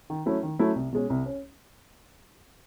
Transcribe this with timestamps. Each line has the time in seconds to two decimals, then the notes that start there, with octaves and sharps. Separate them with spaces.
0.10 D#3
0.26 F#3 A3 C#4 E4
0.43 D#3
0.59 F#3 A3 C#4 E4
0.76 C2
0.92 B2 G#3 C#4
1.10 C2
1.26 C#4